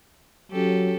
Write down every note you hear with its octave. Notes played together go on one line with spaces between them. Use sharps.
F#3 C#4 G4 A4